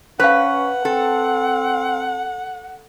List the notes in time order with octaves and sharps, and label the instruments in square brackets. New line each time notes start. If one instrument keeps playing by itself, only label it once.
[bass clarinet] C#4 [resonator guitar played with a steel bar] B4 [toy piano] C5 F5 [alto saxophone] F#5
[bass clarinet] C4 [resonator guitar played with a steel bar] A4